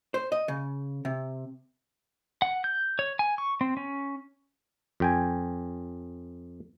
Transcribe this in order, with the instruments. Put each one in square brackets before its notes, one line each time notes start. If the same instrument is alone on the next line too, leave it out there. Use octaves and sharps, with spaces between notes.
[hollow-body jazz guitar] C5
D#5
C#3
C3
[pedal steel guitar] F#5
G6
C#5
G#5
C#6
C4
C#4
[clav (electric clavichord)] F2 G5 G#5